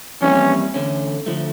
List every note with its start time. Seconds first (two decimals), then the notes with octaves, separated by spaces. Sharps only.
0.22 F2 E3 G3 A#3 C#4 E4
0.74 E2 D3 A3 C#4
1.26 D3 F3 A3